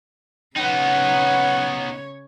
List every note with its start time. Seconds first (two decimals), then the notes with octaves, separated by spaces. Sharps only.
0.57 C#3 B3 D#4 C#5 F#5